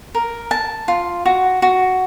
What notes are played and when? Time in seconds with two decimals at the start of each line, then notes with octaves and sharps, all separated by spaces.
0.15 A#4
0.51 A5
0.88 F4
1.26 F#4
1.62 F#4